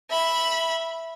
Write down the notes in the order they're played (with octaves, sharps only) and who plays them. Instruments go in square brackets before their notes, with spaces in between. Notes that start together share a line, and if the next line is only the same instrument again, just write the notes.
[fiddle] E5 B5